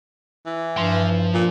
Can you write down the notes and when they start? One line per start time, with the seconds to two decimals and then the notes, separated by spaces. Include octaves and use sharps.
0.46 E3
0.77 G2 F3 C6
1.34 A#2